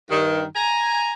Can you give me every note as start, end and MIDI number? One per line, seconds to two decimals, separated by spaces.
0.11 0.43 43
0.11 0.43 51
0.56 1.13 80
0.56 1.13 82